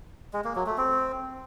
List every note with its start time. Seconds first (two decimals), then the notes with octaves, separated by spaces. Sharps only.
0.33 G#3
0.44 A#3
0.55 F#3
0.67 A3
0.78 C4